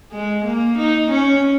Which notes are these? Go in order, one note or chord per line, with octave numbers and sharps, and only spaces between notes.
G#3
A#3
D#4
C#4